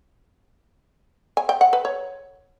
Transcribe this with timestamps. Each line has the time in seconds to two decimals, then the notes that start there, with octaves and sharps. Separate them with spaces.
1.37 G#5
1.49 G5
1.61 F#5
1.73 B4
1.85 C#5